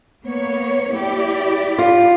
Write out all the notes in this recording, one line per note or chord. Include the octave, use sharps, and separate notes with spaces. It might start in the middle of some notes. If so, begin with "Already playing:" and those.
A#3 B3 C#5
E4 G4 D5
F4